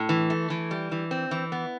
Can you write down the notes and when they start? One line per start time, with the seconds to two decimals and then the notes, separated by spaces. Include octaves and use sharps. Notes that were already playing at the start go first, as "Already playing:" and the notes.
Already playing: A2
0.09 E3
0.30 A3
0.50 E3
0.71 G3
0.92 E3
1.11 C4
1.31 E3
1.52 B3